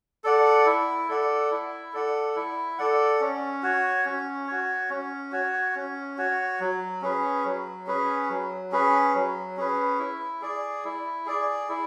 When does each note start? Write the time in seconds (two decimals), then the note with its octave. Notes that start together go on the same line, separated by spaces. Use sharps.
0.24 A4 D5 F#5
0.66 E4
1.08 A4 D5 F#5
1.51 E4
1.93 A4 D5 F#5
2.36 E4
2.78 A4 D5 F#5
3.21 C#4
3.63 F#4 C#5
4.05 C#4
4.48 F#4 C#5
4.90 C#4
5.32 F#4 C#5
5.75 C#4
6.18 F#4 C#5
6.60 F#3
7.02 C#4 G#4 B4
7.45 F#3
7.87 C#4 G#4 B4
8.29 F#3
8.72 C#4 G#4 B4
9.14 F#3
9.57 C#4 G#4 B4
9.99 E4
10.42 G#4 D5
10.85 E4
11.26 G#4 D5
11.69 E4